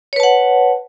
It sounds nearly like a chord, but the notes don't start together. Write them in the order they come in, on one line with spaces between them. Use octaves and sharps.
C#5 B4 A5 F#5